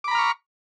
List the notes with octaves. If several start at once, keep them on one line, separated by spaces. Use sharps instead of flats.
A#5 B5 C#6 D6 F6